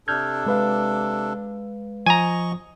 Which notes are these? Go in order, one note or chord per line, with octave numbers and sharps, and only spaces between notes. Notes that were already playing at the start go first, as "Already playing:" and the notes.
C3 D4 A4 F6 G6 G#6
G#3 B4 F5
F3 D#5 G#5 A#5 C#6